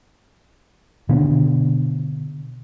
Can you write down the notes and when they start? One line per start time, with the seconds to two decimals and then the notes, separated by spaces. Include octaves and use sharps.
1.09 B2 D3 B3 D4